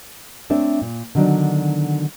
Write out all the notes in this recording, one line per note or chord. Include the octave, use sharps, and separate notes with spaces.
A3 C4 D4 B4 C#5 E5
A#2
D3 D#3 F#3 B3 D4